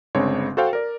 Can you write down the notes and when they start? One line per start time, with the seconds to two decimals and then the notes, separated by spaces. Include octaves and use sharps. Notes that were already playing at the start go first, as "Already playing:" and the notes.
0.15 G1 C#3 G#3 C4 D4 C#5
0.57 F#4 A4 C5 F5 G5
0.73 A#4 D5